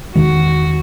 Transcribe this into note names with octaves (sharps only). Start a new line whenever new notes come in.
E2 D#3 G#3 F#4